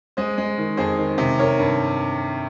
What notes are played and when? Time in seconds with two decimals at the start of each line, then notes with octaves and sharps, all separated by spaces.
0.17 G#3 C5 D#5
0.38 G#3
0.58 D#3
0.77 F2 G#4 C5
0.98 D#3
1.18 C3
1.39 D#3 A#4 C#5
1.59 G2